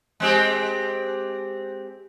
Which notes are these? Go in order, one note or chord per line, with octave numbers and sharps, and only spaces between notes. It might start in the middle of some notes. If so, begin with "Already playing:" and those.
G#3 C4 G4